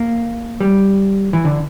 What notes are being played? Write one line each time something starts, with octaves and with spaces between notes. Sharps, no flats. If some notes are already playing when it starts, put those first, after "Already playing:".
Already playing: A#3
G3
E3
D3